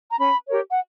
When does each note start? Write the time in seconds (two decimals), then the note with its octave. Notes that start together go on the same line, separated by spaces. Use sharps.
0.10 A#5
0.18 C#4 B5
0.49 G4 A#4 C#5
0.69 F#5